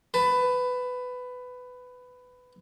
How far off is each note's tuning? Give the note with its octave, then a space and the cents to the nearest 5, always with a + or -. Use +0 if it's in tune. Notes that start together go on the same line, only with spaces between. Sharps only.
B4 +15 A5 +0